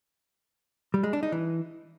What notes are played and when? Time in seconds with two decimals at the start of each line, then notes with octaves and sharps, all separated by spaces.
0.94 G3
1.03 G#3
1.13 D4
1.23 D#4
1.32 E3